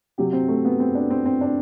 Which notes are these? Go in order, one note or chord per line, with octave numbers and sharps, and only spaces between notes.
C3 F#3 G4
C4
A3
B3
C4
D4
C4
C4
D4